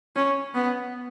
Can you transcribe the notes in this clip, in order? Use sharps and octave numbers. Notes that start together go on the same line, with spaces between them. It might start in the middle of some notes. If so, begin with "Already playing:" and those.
C#4
B3